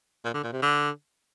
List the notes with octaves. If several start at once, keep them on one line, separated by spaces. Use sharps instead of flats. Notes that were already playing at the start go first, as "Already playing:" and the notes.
A#2
D3
A#2
C3
D3